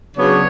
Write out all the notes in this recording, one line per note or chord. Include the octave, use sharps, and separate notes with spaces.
C#3 F#3 B3 D4 C#5